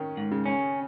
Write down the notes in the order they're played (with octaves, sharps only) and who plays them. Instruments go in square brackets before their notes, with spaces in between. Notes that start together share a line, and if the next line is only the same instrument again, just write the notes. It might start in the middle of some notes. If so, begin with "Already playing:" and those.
Already playing: [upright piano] D#3 C#4
[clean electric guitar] G#2
[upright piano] C#3
[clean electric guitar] C#4